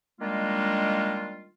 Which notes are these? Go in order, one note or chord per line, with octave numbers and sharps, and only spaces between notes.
D#3 G3 G#3 A#3 D4 F4